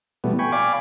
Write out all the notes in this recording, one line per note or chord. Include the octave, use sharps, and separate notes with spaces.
B2 E3 G3 A3 B3
G5 G#5 B5 C#6
D5 F5 G#5 B5 D6